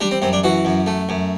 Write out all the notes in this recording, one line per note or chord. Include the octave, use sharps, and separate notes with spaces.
G3 D4
C4
F#2 C4
D4
E3 F#4
F#2
A3
F#2